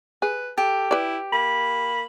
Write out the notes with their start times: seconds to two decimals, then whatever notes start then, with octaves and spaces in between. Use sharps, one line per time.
0.22 G#4 B4
0.58 G4 A4
0.91 E4 B4 D5
1.33 A#3 B5